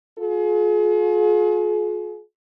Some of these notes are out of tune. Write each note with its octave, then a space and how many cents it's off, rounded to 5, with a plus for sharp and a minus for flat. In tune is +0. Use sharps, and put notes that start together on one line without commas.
F4 +40 G#4 +40